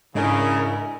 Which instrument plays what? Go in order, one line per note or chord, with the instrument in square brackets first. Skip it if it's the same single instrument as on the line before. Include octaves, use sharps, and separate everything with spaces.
[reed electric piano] G#2 [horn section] C#3 [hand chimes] D4 D#5 G#5 [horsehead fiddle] E4 A#4